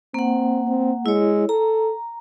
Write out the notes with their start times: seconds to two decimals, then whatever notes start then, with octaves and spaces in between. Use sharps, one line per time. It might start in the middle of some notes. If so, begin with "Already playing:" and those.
0.14 A#3 C4 F#5
0.68 C4
1.06 G#3 E4 C#5
1.49 A4 A#5